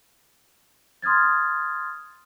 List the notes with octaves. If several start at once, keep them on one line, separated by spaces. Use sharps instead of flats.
C6 D#6 F6 G#6 A6